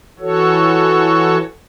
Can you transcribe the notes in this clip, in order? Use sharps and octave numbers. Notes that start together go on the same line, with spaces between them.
E3 F#4 A4 C#5